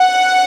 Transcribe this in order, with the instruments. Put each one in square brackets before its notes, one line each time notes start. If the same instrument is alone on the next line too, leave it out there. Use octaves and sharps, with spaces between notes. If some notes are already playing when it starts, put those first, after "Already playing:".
Already playing: [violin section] F#5